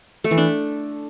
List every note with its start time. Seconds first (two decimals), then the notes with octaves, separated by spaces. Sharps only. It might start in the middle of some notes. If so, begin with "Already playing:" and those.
0.24 A3
0.31 E3
0.37 D4